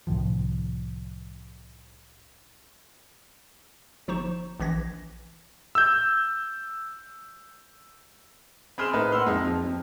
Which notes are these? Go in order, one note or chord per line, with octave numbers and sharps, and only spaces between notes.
C2 A2 D#3 F3
G1 F3 D#4 C5 C#6 E7
A#1 E3 G#6 A#6
E6 G6
C4 G#4 B5 C6 F6 E7
A2 A#3 D#4 B4
F#5 C6 E6 F6
F2 G#3 D#4
F3
F2